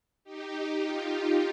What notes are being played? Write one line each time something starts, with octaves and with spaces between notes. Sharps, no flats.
D#4 G4
F4